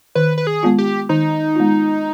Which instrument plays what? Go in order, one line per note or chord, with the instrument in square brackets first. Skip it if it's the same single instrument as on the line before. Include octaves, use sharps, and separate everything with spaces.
[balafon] D#3 [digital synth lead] B4
[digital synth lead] B4
G#4
[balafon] G#3 B3 F4
[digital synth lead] G4
[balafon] D#3 [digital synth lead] D#4
[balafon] G#3 B3 F4